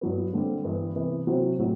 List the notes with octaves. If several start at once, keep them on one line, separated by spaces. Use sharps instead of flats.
G2 F#3 B3
D3 G3 C4
G2 E3 B3
C3 E3 B3
C3 F#3 C4 F#4 C5
A2 F#3 C4